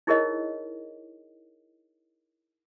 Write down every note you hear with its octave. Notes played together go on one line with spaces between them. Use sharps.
D#4 E4 G#4 A#4 C#5 D#5